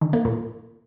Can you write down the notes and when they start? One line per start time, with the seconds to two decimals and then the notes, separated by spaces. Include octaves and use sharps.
0.01 D#3
0.13 A#3
0.25 A#2